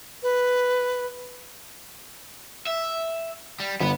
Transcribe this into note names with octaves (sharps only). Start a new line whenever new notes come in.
B4
E5
G3
G1 B3 B4